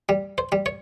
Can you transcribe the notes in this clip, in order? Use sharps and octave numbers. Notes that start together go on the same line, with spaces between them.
G3
C5
G3
C#5